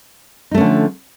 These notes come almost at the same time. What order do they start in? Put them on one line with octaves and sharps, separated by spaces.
D#4 A3 C#4 D3 F3